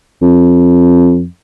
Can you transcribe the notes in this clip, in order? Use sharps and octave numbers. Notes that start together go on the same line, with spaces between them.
F2